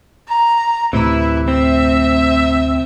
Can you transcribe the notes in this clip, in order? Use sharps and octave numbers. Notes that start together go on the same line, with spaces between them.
A#5
D2 A2 C3 E3 E4
C4 E5